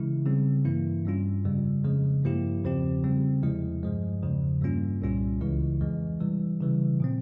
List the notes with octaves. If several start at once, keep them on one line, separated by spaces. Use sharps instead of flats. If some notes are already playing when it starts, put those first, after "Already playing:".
Already playing: C#3 E3 G#3 E4
C#3 G3 C4
G2 E3 A#3 E4
G2 G3 C#4 F4
F2 C#3 G3
F2 C#3 F3 G#3
G2 F3 A#3 E4 G4
E2 C#3 F3 C4 G4
C#3 G3 C4
E2 C3 F3 G#3 E4
G2 F3 G#3
E2 C#3 F3
G2 G3 A#3 C#4 F4
C2 A#2 G3 C#4 F4
C#2 C#3 E3 G#3 E4
F2 E3 G#3
C3 E3 G3
C#3 E3 G3
A#2 F3 C4